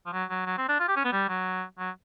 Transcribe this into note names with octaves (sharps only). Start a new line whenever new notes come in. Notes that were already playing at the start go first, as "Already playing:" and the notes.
F3
F#3
F#3
F#3
C4
D4
F4
G4
C#4
B3
G3
F#3
F#3